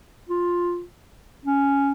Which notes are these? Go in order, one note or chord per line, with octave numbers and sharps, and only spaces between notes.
F4
C#4